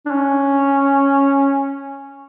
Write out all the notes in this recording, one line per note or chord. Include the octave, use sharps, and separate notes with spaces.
D4
C#4